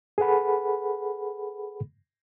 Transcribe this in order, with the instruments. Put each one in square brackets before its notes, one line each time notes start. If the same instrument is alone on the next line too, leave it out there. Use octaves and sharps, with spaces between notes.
[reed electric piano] G#4 A4 B4 F#5 B5